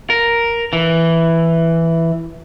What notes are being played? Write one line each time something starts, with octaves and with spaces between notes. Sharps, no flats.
A#4
E3